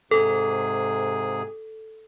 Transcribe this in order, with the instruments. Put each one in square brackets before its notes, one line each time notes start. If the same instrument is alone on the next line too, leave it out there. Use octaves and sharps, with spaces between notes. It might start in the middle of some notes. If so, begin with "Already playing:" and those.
[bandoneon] G#2 C3 G#4 [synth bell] A4